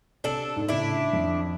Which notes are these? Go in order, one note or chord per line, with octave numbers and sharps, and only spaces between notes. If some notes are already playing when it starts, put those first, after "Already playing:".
C3 D4 A4 F#7
G#2
A2 C#3 D4 E4
F2